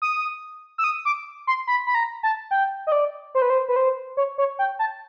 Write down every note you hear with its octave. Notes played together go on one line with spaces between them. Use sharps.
D#6
E6
D#6
D6
C6
B5
B5
A#5
A5
G5
D#5
D5
C5
B4
C5
B4
C5
C#5
C#5
G5
A5